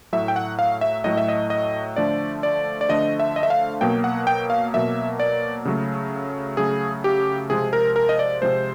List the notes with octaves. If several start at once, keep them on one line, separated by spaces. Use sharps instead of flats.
A2 F#3 A3 E5
G5
F#5
F5
E5
A2 F#3 A3 D#5
E5
D#5
D#5
D3 F3 A3 D5
D5
D5
D3 F3 A3 D#5
E5
D#5
E5
F5
B2 F#3 A#3 G5
F#5
G5
F5
B2 F#3 A#3 E5
D5
C#3 F#3 A3
C#3 F#3 A3 G#4
G4
C3 F3 G#3 G#4
A#4
A#4
D#5
D5
C3 F3 G#3 C5